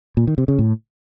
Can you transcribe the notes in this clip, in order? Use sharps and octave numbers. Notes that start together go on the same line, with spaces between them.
A#2
D#3
C3
C#3
A2